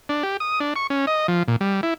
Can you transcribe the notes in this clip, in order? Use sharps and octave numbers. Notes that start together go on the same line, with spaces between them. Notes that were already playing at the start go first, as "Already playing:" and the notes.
D4
G4
D#6
D4
C#6
C#4
D#5
F3
A#2
G3
E4